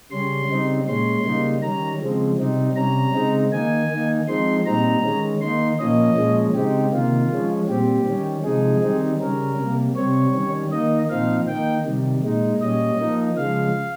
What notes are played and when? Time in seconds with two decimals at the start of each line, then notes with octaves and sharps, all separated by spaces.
0.11 C#3 G3 C#4 C6
0.50 C#3 G3 C4 D#4
0.88 A#2 G#3 C#4 C6
1.25 C#3 G3 A#3 D#4
1.62 D#3 G3 C#4 A#5
2.01 C#3 F3 G#3 C4
2.38 C3 G3 C4 D#4
2.76 C3 G3 C#4 A#5
3.14 C#3 G#3 C4 D#4
3.52 D#3 A#3 D#4 G#5
3.90 D#3 A#3 D#4
4.28 F3 G#3 C4 D#4 C6
4.66 A#2 G3 C4 D#4 A#5
5.04 D#3 G#3 C#4
5.41 D#3 A#3 D#4 C6
5.79 A#2 F3 A#3 C#4 D#5
6.17 A#2 F3 G#3 C#4
6.55 C#3 G#3 C4 D#4 G4
6.93 C3 D#3 A#3 F4
7.30 F3 G#3 C#4
7.69 A#2 G3 C4 G4
8.07 D#3 G3 C#4
8.44 C3 F3 G#3 D#4 G#4
8.82 D#3 G3 C4 D#4
9.21 C#3 G3 C#4 A#4
9.58 C3 G3 A#3
9.96 C3 G3 C4 C#5
10.34 D#3 G3 C#4
10.72 D#3 A#3 D#4 D#5
11.09 A#2 F3 C4 D#4 F5
11.47 D#3 A#3 D#4 G5
11.86 C3 D#3 G3
12.23 A#2 G#3 D#4
12.61 A#2 G3 C#4 D#5
12.99 F3 A#3 D#4
13.37 C#3 F3 G#3 F5